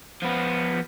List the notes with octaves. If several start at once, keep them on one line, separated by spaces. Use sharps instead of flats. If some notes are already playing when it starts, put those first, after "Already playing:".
F3 B3